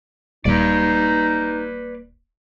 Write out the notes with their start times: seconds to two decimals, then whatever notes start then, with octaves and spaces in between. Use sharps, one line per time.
0.45 D#1 G3 A#3 D#4 B4 D5